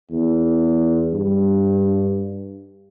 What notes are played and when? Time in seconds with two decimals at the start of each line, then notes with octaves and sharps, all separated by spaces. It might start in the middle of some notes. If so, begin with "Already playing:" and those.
0.11 E2
1.13 G2